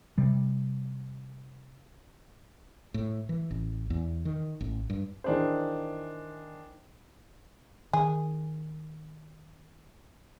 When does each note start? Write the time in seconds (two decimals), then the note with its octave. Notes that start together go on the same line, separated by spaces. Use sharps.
0.18 C3 G3
2.94 A2
3.29 E3
3.51 A1
3.90 E2
4.25 D#3
4.61 A1
4.90 G2
5.24 D#3 E3 D4 G#4 C5
7.93 D#3 G#4